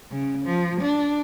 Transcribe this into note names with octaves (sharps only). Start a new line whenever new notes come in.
C#3
F3
D4